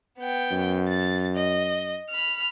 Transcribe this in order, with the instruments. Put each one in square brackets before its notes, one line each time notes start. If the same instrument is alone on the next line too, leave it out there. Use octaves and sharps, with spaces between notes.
[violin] B3 G5
[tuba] F#2
[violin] A6
D#5
B5 F6